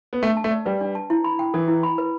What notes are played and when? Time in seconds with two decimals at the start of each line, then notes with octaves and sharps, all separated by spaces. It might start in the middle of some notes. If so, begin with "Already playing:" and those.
0.13 B3
0.22 A3 D4
0.37 A5
0.44 A3
0.51 D5
0.66 G3 B4
0.81 D4
0.95 A5
1.10 E4
1.24 B5
1.39 G5
1.54 E3 A4
1.68 E4
1.83 B5
1.98 B4